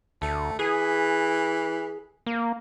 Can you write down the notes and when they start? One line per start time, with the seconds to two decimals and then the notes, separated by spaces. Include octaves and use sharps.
0.22 D2 A3
0.59 E3 G#4
2.27 A#3